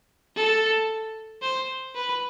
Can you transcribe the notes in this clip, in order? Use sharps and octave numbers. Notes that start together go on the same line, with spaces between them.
A4
C5
B4